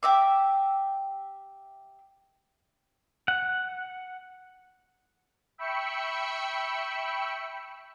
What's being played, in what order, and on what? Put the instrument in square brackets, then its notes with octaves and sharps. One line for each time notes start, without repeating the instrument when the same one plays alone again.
[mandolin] G4 E5 D6
[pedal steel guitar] F#5
[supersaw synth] E5 G5 B5 C#6 E6 C#7